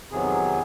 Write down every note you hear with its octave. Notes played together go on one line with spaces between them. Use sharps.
F2 C3 D#3 F#3 B3 G#4